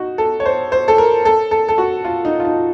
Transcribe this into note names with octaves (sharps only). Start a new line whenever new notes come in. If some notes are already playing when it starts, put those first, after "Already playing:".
Already playing: D#4 F#4
A4
C#5
C5
C5
A4
A#4
A4
A4
A4
F#4
F4
D#4
F4
D#4